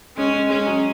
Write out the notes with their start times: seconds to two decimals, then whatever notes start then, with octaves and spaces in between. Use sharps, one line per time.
0.17 G#3 C#4
0.33 G#3
0.50 G#3 C#4
0.66 F#3